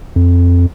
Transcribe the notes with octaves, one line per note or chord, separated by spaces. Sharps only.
F2